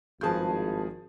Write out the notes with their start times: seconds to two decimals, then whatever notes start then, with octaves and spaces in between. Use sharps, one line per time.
0.21 G#1 G2 F3 G#4 A5 G6